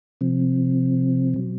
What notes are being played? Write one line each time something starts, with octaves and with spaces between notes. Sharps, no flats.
C3 F3 C4
B2 F#3